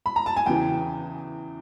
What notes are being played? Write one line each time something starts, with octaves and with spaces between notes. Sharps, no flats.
B5
A#5
A5
G#5
E2 C#3 E3 G5